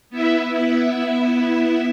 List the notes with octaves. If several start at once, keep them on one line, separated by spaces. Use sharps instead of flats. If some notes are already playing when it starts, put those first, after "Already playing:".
B3 E4 E5